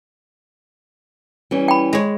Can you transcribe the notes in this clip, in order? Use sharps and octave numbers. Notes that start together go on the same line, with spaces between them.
E3 G3 C#4
G5 B5
G#3 C#5